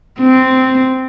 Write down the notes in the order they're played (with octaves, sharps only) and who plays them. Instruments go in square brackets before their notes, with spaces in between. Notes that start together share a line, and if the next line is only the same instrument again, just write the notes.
[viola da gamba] C4